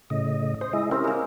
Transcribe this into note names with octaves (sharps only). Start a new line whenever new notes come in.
A2 C#3 D#5
C5 D#6
G#3 E4 D#5
C4 C#4 E4 G4 A#4
G#3 A#3